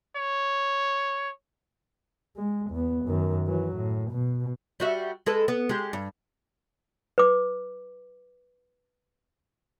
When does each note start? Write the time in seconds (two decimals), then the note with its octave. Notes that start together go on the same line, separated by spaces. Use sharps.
0.17 C#5
2.36 G#3
2.71 E2 B3
3.05 F#2 D#3
3.47 E3 F#3
3.76 A2
4.11 B2
4.80 G3 F#4 E5
5.26 G#3 A4 B4
5.48 B3
5.69 G#3 G4
5.93 G2
7.18 B4 D6